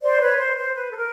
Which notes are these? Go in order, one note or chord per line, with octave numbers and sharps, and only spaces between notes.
C5 D5
B4 C#5
C5
C5
B4
A4
A#4